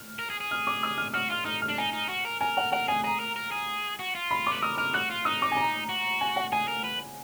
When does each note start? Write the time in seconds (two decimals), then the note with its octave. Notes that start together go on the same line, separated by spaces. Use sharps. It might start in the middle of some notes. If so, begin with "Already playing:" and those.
Already playing: F6
0.19 A#4
0.30 G#4
0.40 G#4
0.51 F6
0.67 D6
0.83 D#6
0.98 F6
1.13 F#4 F6
1.30 F4 F6
1.45 D#4 F6
1.62 F6
1.68 D4
1.78 D#4 G#5
1.93 D#4
2.09 F#4
2.25 A#4
2.41 A#4 G#5
2.57 F#5
2.72 A#4 F#5
2.88 G#4 G#5
3.03 G#4 A#5
3.20 A#4
3.36 A#4
3.51 G#4
3.99 F#4
4.15 F4
4.31 B5
4.47 D6
4.52 B4
4.62 A#4 D#6
4.78 A#4 F6
4.94 F#4 F#6
5.10 F4
5.25 D#4 D#6
5.42 D6
5.52 G#5
5.57 A#5
5.89 F#4
6.21 G#5
6.36 F#5
6.52 G#4 G#5
6.68 A#4
6.84 B4